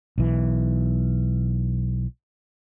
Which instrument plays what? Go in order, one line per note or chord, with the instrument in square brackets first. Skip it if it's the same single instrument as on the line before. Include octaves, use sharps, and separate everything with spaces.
[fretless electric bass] B1 E3